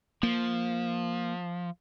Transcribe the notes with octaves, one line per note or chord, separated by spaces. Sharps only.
F3 A#3